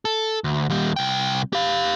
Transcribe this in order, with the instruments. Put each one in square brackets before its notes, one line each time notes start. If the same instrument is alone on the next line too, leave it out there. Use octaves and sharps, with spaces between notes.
[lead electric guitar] A4
D2
D#2 G3
C2 G5
G4 F5